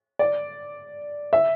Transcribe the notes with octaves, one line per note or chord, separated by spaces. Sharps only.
D5
E5